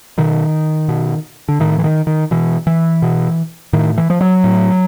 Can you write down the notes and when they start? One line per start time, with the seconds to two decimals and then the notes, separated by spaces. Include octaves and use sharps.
0.18 B2 D#3
0.88 B2
1.49 D3
1.60 A2 D#3
1.78 E3
1.84 D#3
2.07 D#3
2.31 B2 E3
2.67 E3
3.02 B2
3.73 A2 D#3
3.98 E3
4.10 F3
4.21 F#3
4.44 A2